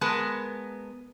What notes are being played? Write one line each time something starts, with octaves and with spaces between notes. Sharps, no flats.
G#3 B3 A#4 A5